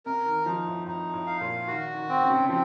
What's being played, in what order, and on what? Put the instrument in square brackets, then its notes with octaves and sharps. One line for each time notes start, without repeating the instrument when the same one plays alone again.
[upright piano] C3 [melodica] A#4
[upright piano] D#3
[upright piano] F3 [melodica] D#4
[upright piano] A2
[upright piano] A2 [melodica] D#4
[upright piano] A2
[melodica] F5
[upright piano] A#2
[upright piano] D#3 [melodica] F#4
[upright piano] D#3
[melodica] C4
[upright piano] C#3
C3
C#3
[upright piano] F3 [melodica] C4